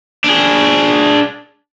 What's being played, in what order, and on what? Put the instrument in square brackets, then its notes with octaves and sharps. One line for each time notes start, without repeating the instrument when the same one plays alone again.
[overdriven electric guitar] D4 G#4